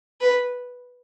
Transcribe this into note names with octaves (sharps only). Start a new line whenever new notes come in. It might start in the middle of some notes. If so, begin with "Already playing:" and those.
B4